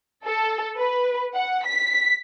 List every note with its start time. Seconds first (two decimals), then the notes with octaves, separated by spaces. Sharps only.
0.25 A4
0.77 B4
1.34 F#5
1.66 B6